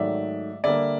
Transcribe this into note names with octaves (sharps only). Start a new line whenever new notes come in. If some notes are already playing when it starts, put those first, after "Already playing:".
Already playing: G#2 D#3 F#3 A3 D5 E5
D3 G3 A#3 D5 E5